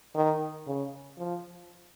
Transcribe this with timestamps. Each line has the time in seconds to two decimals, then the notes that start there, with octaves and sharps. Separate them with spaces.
0.15 D#3
0.67 C#3
1.18 F3